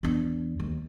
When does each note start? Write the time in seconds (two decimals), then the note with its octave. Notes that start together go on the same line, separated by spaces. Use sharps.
0.03 E2 D4
0.60 D#2